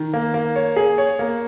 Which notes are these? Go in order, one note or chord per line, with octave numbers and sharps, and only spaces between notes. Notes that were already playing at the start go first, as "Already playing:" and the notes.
Already playing: D#3
A#3
A#3
C#5
G#4
C#5
A#3